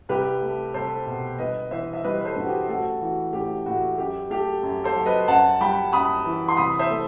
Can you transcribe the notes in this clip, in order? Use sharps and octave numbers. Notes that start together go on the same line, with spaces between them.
C2 G4 B4
A3
C2 A4 C5
B2
G1 B4 D#5
E3 C5 E5
E5
G3 B4 D#5
B4
A4 C5
G2 F#4
G4
A1 F#4 A4
E3 F#4
A1 G4
A2 F#4
F#2 G4
A3 G4
F#2
A4 C5
F#3
B4 D#5
F#2 F#5 A5
G3 G5 B5
F#2 B5 D#6
E3
C6
C2 B5 D#6
C5 E5
A3